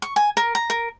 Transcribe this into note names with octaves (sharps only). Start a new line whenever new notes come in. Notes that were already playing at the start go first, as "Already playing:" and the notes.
C#6
G#5
A#4
A#5
A#4